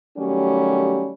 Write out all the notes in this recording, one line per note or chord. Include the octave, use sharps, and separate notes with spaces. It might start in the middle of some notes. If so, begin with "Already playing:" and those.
D#3 F#3 G3 A3 C#4 G4